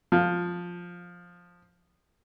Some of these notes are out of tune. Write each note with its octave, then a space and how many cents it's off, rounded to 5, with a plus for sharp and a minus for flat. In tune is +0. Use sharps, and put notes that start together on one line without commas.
F3 +10